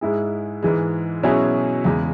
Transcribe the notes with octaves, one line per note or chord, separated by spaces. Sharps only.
G#2 G#3 E4 G#4
G#2 E3 G#3
B2 F#3 C#4 E4 G#4
E2 C#3 G#3